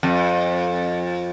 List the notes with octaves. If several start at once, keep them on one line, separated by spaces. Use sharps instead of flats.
F2